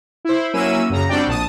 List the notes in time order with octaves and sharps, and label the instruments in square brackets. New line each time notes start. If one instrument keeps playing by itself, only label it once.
[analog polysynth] E4 C5
F#3 A#3 C#4 E4 E6 D#7
F#2 C#3 A#5
G3 C4 D4 F#4 D5 G5
A#1 A5 D#6